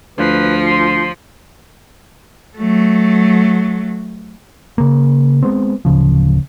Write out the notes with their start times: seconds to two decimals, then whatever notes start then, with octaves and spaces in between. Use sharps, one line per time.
0.18 D2 F3 B4
0.66 C6
2.57 F#3 A3
4.78 C#3 A#3
5.43 G#3 B3 C4
5.85 D1 C#3 F3